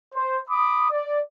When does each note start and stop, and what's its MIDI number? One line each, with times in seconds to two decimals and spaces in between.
0.14 0.38 72
0.49 0.89 83
0.49 0.89 86
0.49 0.89 87
0.90 1.20 74